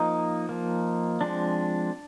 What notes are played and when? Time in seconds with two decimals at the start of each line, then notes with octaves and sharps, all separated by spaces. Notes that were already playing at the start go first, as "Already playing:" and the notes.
Already playing: F3 A#3 D#4
0.49 F3 A#3
1.21 F3 G#3 C4 D4